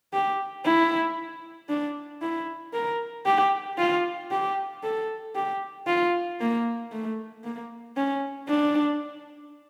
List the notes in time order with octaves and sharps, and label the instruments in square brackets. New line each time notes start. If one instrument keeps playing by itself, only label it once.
[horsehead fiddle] G4
E4
D4
E4
A#4
G4
F4
G4
A4
G4
F4
A#3
A3
A#3
C#4
D4